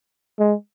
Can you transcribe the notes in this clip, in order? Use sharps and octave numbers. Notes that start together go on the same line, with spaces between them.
G#3